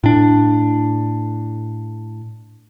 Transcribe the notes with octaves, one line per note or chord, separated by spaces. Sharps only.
A2 D4